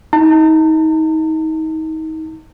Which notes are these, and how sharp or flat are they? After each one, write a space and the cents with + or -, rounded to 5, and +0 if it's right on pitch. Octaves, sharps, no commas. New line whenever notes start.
D#4 +30 A5 +45